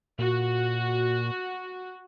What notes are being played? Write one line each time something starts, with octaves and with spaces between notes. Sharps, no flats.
A#2 F#4